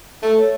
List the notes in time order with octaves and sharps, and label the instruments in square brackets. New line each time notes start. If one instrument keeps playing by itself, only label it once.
[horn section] A3 [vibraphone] A4
[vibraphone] C#5